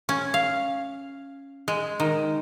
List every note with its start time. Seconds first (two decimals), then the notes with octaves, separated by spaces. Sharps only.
0.09 C#4
0.34 F5
1.68 G#3
2.00 D#3